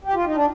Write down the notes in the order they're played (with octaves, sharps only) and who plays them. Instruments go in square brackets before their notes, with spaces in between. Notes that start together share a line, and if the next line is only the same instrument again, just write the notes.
[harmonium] G4
F4
D#4
D4